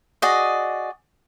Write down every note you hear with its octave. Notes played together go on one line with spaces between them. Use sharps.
F#4 G#4 D5 D#5